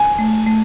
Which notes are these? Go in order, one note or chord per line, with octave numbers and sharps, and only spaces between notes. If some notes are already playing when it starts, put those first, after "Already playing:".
Already playing: G#5
A3
A3